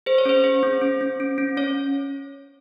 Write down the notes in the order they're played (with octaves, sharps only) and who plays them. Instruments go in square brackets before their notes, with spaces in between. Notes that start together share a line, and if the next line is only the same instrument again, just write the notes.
[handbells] G#4 C5
C#5
C#4 C5
G#4
C#4
C#4
C#4
C#4
C#4
C#4 C#5